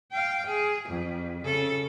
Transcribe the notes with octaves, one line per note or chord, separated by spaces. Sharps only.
F5 G5
G#4
F2
C#3 A4